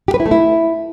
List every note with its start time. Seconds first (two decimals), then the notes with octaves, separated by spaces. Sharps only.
0.08 G4
0.14 B4
0.20 E4
0.26 A3
0.31 E4